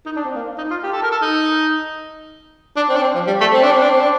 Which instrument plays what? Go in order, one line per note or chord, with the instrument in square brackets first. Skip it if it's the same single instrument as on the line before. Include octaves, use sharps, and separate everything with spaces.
[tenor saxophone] D#4
D4
C4
A#3
D#4
F4
G4
A4
A#4
A4
D#4
D4
C4
D4
C4
F3
G3
A3
C4
D4
C4
D4
C4
D4